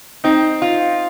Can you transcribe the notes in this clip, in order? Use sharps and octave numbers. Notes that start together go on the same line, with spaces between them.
C4 D#4
F4